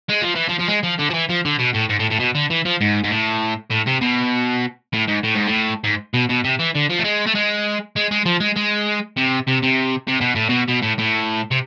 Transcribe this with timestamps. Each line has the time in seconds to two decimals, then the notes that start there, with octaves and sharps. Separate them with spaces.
0.09 G#3
0.22 F3
0.35 E3
0.49 F3
0.60 F3
0.68 G#3
0.84 F3
0.99 D3
1.10 F3
1.14 E3
1.29 F3
1.45 D3
1.59 B2
1.74 A2
1.89 G#2
1.99 A2
2.11 A2
2.19 B2
2.35 D3
2.50 E3
2.65 F3
2.81 G#2
3.04 G#2
3.10 A2
3.71 A2
3.87 C3
4.01 B2
4.93 A2
5.08 G#2
5.23 A2
5.35 G#2
5.47 A2
5.84 G#2
6.14 B2
6.29 B2
6.44 C3
6.59 E3
6.75 D3
6.90 F3
6.99 A3
7.04 G#3
7.27 A3
7.35 G#3
7.96 G#3
8.11 G#3
8.26 F3
8.40 G#3
8.56 G#3
9.17 C3
9.47 C3
9.62 C3
10.08 C3
10.21 B2
10.35 A2
10.50 B2
10.68 B2
10.82 A2
10.99 A2
11.51 C3